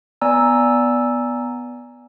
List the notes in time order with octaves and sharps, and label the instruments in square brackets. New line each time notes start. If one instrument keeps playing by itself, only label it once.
[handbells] B3 D5 G#5 A#5 E6